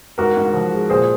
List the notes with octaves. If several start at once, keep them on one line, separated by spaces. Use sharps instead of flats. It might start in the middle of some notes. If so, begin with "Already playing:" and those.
G#2 F#4 A#4
G#2
F3
G#3
A#2 G#4 C5